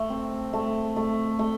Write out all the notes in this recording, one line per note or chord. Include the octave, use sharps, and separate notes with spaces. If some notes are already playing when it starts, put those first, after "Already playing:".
Already playing: A3
C4
A3
A3
A3